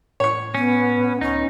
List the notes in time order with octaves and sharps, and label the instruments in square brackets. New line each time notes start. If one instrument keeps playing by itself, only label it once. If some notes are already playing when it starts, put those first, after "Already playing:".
[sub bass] A2 [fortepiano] C#5 C#6
[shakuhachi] B3 [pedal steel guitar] C#4
[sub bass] C#2 [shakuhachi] C#4 [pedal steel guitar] D#4